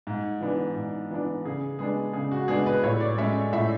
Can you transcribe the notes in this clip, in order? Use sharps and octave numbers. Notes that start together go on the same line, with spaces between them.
G#2
E3 B3 D4
G#2
E3 B3 D4
C#3 G#4
G#3 B3 D4 G#4
C#3 G#4
F#4
G#3 B3 D4 G#4
B4
A2 C#5
D5
G#3 C#4 E5
A2 E5